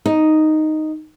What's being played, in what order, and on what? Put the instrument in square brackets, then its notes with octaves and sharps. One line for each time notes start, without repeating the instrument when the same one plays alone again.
[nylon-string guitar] D#4